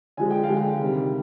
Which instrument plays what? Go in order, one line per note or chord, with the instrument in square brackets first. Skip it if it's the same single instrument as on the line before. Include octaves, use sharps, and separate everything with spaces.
[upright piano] D3 F3 G#3 G#5
G5
F5
D3 G#3
G5
C3 D#3 G3